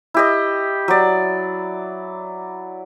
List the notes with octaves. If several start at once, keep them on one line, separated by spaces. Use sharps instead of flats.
E4 G4 D#5
F#3 D5